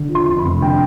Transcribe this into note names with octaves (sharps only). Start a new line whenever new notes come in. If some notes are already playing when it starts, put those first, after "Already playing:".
Already playing: D3
F3
C6
F2
B5
F1
D3 G5